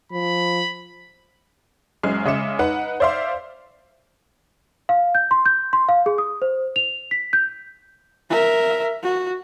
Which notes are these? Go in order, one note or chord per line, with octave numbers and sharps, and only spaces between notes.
F3 B5
F#1 F#2 G#3 F6 C7
C#3 G#3 E5 D6 C#7 E7
D#4 B4 F#5
C5 D5 E5 F5 C6
F5
G6
C6
G6
C6
F5
G#4
D#6
C5
F7
B6
G6
A#4 E5
F#4